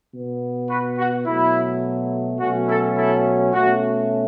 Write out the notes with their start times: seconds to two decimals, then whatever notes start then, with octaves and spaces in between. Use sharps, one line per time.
0.13 B2 B3
0.70 F#4 B4
0.99 F#4
1.26 B2 F#3 A3 E4
2.40 B2 F#3 A3 C#4 F#4
2.69 E4 A4
2.97 E4 A4
3.54 B2 A3 C#4 F#4